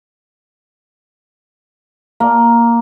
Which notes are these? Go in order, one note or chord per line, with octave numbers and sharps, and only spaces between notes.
A#3